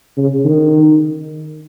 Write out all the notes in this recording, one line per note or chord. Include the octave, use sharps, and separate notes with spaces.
C#3
D#3